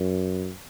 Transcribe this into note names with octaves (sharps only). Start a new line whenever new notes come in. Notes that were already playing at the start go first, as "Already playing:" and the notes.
Already playing: F#2